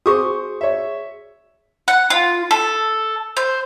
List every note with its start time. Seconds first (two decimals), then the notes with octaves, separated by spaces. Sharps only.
0.06 F#4 G#4 C5 C#6 D#6
0.61 C#5 E5
1.88 F#5
2.10 F4
2.51 A4
3.37 C5